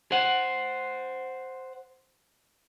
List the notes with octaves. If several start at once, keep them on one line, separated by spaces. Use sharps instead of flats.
C5 F#5